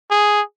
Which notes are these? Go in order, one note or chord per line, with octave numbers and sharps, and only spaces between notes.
G#4